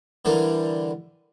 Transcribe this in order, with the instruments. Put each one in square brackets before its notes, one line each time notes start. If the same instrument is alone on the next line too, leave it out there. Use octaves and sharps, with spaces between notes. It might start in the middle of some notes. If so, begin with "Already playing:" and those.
[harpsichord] D3 E3 G3 A#4